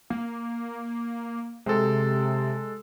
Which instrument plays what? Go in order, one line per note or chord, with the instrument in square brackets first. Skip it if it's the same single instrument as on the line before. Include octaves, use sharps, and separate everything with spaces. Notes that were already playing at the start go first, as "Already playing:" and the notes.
[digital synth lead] A#3
[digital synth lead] C3 [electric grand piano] G#3 A4